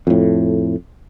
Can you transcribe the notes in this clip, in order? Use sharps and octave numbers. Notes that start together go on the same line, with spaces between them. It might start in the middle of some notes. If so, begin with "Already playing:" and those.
F2 A2